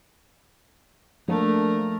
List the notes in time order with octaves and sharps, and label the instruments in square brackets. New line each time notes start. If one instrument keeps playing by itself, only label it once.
[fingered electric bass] F3 A#3 D4 [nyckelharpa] A3 A#4